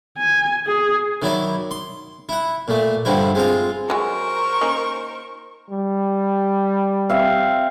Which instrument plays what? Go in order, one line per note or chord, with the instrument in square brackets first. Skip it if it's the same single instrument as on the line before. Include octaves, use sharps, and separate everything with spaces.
[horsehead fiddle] G#5
G#4
[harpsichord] D#3 F#3 E4 D5
C6
E4 F#5
A#2 A3
G2 D3 F3 G3 E4
G#3 C4 F4
[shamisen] F#3 G#3 [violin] A#4 C5 [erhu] C#6
[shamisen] A#3 C#4 D#4
[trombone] G3
[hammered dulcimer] C4 E5 F5